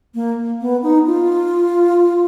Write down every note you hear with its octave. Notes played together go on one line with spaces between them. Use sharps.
A#3
B3
D#4
F4